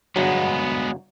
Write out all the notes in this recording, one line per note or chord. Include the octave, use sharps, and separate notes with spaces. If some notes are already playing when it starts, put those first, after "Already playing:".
G1 F#3 G#3 B3